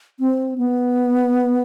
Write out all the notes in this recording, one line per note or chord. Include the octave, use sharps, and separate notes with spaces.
C4
B3